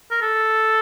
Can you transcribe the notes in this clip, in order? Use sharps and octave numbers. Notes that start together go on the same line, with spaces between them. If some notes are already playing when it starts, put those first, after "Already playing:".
A#4
A4